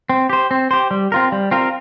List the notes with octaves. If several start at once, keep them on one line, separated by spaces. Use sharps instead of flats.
C4
G4 C5
C4
G4 C5
G3
C4 F4 A#4
G3
C4 F4 A#4